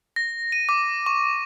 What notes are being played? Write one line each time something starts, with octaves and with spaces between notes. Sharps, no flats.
A#6
D#7
D6
C#6